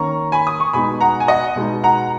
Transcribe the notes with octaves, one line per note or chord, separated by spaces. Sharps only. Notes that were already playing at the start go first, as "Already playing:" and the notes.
Already playing: D#3 A#3 C#4 A#5 C#6
G#5 B5
D#6
C#6
B2 G#3 B3 D#4 G#5 B5
F#5 A#5
G#5
D#5 F#5
B2 G#3 B3 D#4
F#5 A#5